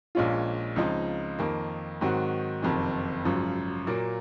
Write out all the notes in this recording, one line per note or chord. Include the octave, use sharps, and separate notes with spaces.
A#1 A#2 G#3 C#4 F4
C#2 C#3 F3 C4 D#4
F2 D#3 A#3
G#2 D#3 F#3 C4 F#4
F#1 F2 C3 D#3
G#1 F#2 C#3 F3
A#2 F#3 A#3